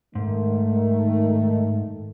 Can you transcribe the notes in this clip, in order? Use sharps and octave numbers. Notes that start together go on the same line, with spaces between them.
G#2 D#3 A3